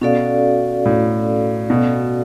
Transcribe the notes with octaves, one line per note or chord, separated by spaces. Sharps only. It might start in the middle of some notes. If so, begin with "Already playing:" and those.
B2 C#4 F#4 A4 D5 F5
A2
B2